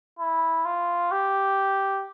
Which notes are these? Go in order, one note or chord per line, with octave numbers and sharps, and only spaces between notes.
E4
F4
G4